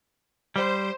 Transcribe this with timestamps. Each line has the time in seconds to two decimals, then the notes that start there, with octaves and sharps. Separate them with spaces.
0.56 G3 C5